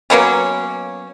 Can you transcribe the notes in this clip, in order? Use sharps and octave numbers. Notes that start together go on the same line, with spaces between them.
F#3 A#3 B3 C#4